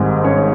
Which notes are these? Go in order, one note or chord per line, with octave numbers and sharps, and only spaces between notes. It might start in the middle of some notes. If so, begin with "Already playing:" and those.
Already playing: G#1 G#2 D#3 G3 D#4
C#4 C#5